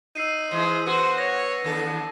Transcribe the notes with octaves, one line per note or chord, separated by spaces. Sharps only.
D#4 E6 C7 D#7
E3 G#3 C5
B3 F#4 C5
C#5 A#6
D#2 D4 A4